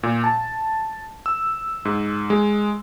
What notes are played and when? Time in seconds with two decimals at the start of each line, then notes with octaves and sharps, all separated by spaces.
0.03 A#2
0.24 A5
1.26 E6
1.85 G#2
2.30 G#3